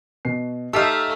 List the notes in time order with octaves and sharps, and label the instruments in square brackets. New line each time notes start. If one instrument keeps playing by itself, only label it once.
[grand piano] B2 C7
[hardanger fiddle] A3 [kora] D#4 G4 A4 [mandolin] E5 F5 [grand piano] E6 C7